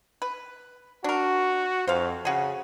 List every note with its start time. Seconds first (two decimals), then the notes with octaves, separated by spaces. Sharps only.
0.22 B4
1.04 D4 F#4 A#4
1.88 F2 C5 F5
2.25 C#3 F#4 G#4